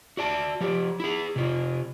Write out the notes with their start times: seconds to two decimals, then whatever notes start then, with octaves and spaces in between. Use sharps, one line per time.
0.17 F#4 D5 A5
0.61 F3 G4
1.00 E4 G#4
1.36 C3 F4